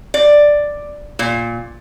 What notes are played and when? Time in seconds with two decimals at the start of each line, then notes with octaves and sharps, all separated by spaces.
0.14 D5
1.19 A#2